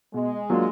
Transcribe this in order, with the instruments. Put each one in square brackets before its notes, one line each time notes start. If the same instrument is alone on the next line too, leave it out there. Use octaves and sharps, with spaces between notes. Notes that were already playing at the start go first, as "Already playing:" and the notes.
[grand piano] B2 [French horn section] G#3
[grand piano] F#3 A#3 D4 F4